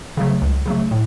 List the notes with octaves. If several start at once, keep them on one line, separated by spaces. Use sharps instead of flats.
C#3 F#3 A3
C#2
C#3 F#3 A3
A2